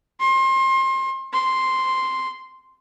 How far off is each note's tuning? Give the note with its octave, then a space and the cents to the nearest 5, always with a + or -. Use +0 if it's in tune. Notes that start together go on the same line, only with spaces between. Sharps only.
C6 +30
C6 +0